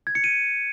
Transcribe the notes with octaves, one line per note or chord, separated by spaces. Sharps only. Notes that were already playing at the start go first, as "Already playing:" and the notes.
G#6
C#7
D#7